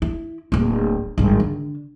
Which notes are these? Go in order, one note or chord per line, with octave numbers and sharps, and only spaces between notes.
E4
D1 A#3
G#1 G2
D3